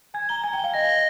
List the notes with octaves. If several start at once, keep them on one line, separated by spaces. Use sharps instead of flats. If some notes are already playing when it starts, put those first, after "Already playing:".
G#5 G#6
A#5 G7
G#5 G#6
G5
F5 G7
D#5 A#6
D#5 G7